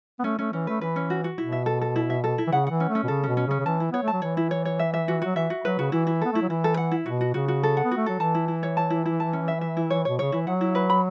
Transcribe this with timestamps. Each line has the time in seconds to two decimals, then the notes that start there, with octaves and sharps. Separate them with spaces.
0.19 B3
0.24 A3 C#4
0.39 A3 C#4
0.53 E3 C#4
0.67 A3 B4
0.81 E3 B4
0.96 C#4
1.10 F#4
1.24 F#4
1.38 B2 E4
1.52 E5
1.66 A4
1.81 A4
1.96 E4
2.10 E5
2.24 A4
2.38 E4
2.47 E3
2.52 C#3 F#5
2.67 E3 F#5
2.80 C#4
2.89 A3
2.95 C#4
3.04 B2
3.08 C#3 A4
3.23 B2 C#4
3.37 C#4
3.47 C#3
3.51 C#4
3.60 C#3
3.66 E3 A5
3.80 E4
3.92 B3 C#5
4.03 A3 A5
4.13 F#3
4.22 E3 C#5
4.37 E4
4.51 C#5
4.65 C#5
4.79 E5
4.94 E5
5.08 F#4
5.22 F#3 F#4
5.36 E3 E5
5.50 F#4
5.65 F#3 B4
5.79 C#3 F#4
5.92 E3 E4
6.07 E4
6.21 B3 A4
6.32 A3 E4
6.41 F#3
6.49 E3 E4
6.64 A4
6.77 F#5
6.92 E4
7.06 B2 F#4
7.21 F#4
7.34 C#3 F#4
7.48 F#4
7.63 A4
7.77 F#5
7.84 B3
7.91 F#4
7.97 A3
8.06 F#3 A4
8.20 E3 A5
8.35 E4
8.48 E4
8.63 C#5
8.77 A5
8.90 E4
9.06 E4
9.20 A5
9.33 C#4
9.48 E5
9.61 E5
9.77 E4
9.90 C#5
10.05 B2 C#5
10.19 C#3 C#5
10.32 E3 E4
10.47 F#3 F#5
10.61 E4
10.75 B4
10.90 B5